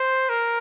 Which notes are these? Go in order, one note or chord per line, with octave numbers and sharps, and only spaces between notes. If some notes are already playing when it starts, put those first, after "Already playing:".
Already playing: C5
A#4